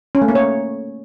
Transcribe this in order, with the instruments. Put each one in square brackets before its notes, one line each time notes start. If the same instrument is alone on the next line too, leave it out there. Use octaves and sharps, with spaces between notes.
[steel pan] C#4
A3
A#3
C#5